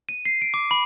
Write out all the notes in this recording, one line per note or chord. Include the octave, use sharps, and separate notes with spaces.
D#7
C7
D7
D6
B5